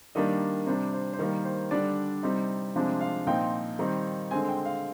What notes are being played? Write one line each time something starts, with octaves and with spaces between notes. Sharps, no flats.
D#3 G3 A#3 D4 D#5
C3 G3 D4 C5
C5
C5
D#3 G3 A#3 A#4
C5
D3 G3 D4 D5
C3 G3 C4 D#4
C3 F3 G#3 D4
F5
A#2 F3 C4 D#4 G5
D#3 G3 C4 D#4
D3 G#3 C4 G#5
G5
F5